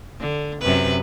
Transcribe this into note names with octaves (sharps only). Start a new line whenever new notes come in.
D3
F#2 C3 B4